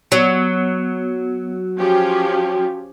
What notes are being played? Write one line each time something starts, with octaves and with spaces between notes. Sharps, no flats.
F#3 B3
F3 C#4 F#4 G4 G5